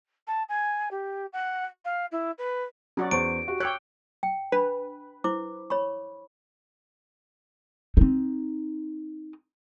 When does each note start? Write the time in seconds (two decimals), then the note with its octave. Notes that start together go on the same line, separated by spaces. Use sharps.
0.27 A5
0.48 G#5
0.91 G4
1.32 F#5
1.84 F5
2.11 E4
2.38 B4
2.97 F#3 C#4 F#4 D5
3.11 E2 C5 C#6 D7
3.48 F#4 G4
3.60 C#5 G5 D6 E6 F#6
4.23 G5
4.52 D4 B4 B5
5.24 E4 C5 D6
5.70 C#5 B5 C#6
7.97 C4 D#4